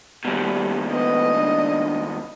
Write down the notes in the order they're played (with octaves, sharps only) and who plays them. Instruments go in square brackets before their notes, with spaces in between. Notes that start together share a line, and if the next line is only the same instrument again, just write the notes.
[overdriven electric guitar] D#2 B2 [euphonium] G3
[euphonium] B3 [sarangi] D#5
[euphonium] D4